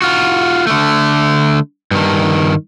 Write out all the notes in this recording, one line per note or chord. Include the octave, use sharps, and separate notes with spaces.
F4 F#4
D3 A3
G2 D#3